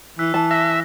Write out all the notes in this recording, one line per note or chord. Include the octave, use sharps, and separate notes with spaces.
E3 E6 F#6 B6
E3 A5
E5 A#6